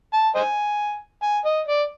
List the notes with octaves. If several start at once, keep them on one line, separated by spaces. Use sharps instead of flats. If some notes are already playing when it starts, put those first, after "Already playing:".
A5
C5 D#5 G#5
G#5
D#5
D5